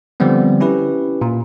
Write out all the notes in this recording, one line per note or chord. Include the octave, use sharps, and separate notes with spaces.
D3 F3 G3 B3 C4
C#4 E4 G4 B4
A#2